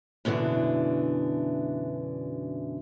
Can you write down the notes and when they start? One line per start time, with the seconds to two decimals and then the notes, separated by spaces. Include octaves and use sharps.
0.25 F#2 B2 D3 E3 D4